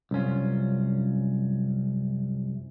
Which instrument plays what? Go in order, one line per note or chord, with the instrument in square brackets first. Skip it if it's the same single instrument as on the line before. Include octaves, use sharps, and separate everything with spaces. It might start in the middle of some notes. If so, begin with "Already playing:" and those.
[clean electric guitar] C2 F#2 C#4 F4